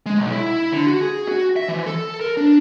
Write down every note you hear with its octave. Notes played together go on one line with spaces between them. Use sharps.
G#3
B1
E4
D3
F#4
G#4
F#4
E5
E3
A4
A#4
D4